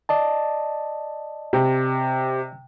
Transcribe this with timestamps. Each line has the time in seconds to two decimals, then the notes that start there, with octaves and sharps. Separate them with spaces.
0.09 D5 D#5 A5
1.53 C3